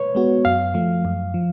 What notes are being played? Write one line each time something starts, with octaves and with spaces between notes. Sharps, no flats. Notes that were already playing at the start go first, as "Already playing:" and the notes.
Already playing: B4 C#5
G#3 B3 F#4
F#2 F5
F3 A3
F#2
F3